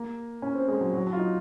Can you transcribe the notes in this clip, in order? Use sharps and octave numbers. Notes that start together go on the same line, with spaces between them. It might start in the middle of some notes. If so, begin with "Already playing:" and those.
Already playing: A#3
C#4
C4
G#3
F#3
F#3
F#3
F4
D#4